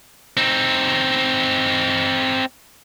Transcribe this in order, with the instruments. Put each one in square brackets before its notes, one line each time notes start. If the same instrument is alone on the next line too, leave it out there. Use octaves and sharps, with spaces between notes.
[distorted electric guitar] C4 D#4